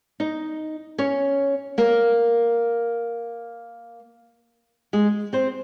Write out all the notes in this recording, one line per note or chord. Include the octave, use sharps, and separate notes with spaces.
D#4 D#5
C#4 C#5
A#3 A#4
G#3 G#4
C4 C5